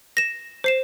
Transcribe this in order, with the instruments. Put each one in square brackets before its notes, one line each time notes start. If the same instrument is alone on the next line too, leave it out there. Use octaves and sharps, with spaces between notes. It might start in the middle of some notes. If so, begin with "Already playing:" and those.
[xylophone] A#6 E7
C5 C7 E7